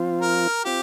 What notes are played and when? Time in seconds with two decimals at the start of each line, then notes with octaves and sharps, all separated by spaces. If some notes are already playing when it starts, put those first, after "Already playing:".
Already playing: F3 C4 F4
0.21 A#4
0.65 C4 F4 G4